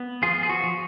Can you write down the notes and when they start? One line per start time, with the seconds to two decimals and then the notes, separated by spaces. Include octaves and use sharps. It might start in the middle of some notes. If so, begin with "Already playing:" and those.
Already playing: B3
0.22 F3 F4 G#4
0.43 G#4
0.49 F#4
0.64 F3